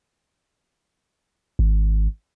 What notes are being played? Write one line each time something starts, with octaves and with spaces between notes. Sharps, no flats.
G#1